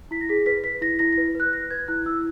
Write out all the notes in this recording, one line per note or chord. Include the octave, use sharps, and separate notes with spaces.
E4 B6
A#6
G#4 B6
B4 B6
B4 B6
E4 A#6
E4 A#6
A#6
B4
B4 F#6
B4 A#6
B4 G#6
E4 F#6
E4 E6